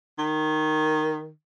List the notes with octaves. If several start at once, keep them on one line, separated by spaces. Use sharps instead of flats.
D#3